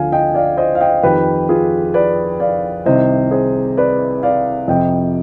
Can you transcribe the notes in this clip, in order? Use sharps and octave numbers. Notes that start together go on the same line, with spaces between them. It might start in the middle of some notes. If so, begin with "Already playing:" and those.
Already playing: D2 D3 F3 F5 G#5
D#5 G5
D5 F5
C5 D#5
F5
D#5 G5
F2 D#3 G4 B4
F4 G#4
B4 D5
D5 F5
C2 C3 D#3 C5 D#5
G#4 C5
B4 D5
D5 F5
F2 C3 F3 D#5 G5